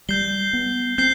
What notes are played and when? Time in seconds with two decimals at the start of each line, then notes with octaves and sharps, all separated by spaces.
0.09 G3 G6 C7 G7
0.53 B3
0.98 C4 G6 C7 G7